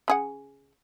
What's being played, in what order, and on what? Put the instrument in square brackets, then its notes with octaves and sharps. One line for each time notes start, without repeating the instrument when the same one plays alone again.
[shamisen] C#3 G#4 F#5